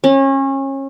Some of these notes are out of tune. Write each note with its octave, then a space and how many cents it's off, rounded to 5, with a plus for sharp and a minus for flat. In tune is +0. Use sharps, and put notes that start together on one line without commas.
C#4 -30